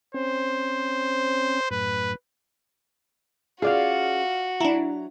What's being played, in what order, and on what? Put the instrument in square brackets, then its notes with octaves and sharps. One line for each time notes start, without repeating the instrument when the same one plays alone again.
[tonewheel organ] C4 C#4 [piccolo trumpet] C5
[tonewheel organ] F#2 A2 [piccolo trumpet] B4
[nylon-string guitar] C#4 G#4 [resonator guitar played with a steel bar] F4 D5 F5 [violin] F#4
[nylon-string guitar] F#3 [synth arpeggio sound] D4 E4 [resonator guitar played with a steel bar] A#5